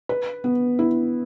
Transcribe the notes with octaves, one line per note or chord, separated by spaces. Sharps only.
B4
B3
E4